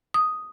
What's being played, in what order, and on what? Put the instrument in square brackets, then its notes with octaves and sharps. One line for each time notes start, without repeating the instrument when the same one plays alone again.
[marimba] D#6